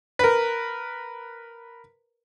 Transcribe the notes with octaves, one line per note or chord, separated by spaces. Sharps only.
A#4 B4